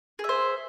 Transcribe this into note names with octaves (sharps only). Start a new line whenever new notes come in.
G#4 C5 E5